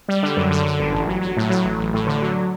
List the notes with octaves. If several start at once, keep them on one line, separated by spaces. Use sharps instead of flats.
G3
D3
F#2
D3
D3
G1
A1
F#3
F#3
A2
F#3
A1
A1
A2
D3
F#3